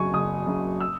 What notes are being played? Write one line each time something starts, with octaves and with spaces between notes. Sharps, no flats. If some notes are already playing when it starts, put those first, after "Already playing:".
Already playing: F#1 F#2 C#3 F#3 G#5 C#6
F#1 D#6
F#2 C#3 F#3
E6